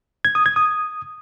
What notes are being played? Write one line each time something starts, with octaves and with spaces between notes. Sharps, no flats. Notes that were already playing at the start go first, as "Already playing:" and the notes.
G#6
D#6
G#6
D#6